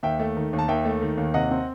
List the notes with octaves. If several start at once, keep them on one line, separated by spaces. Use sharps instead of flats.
D#2 E5 G5
A3
D#3
D#2
A5
D#2 E5 G5
A3
D#3
D#2
C3 D#5 F#5
C4